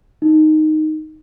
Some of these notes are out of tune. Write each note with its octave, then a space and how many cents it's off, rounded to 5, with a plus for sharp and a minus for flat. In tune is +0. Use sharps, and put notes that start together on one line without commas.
D#4 -5